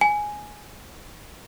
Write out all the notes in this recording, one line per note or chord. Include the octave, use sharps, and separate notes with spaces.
G#5